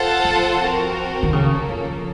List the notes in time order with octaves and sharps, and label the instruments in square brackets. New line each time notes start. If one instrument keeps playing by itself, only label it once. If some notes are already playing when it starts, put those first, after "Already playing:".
Already playing: [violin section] F4 A4 C5 F#5 A5
[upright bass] F3
[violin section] C4 F#4 A#4
[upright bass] D#3
[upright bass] C#3 [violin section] A#3 C#4 A4
[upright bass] F3